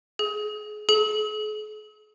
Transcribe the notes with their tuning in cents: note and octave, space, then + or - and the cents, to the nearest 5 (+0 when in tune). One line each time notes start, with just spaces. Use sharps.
G#4 +25
G#4 +45